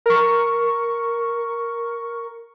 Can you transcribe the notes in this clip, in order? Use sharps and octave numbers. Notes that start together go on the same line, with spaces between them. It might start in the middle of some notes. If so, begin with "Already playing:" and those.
A#4 C#6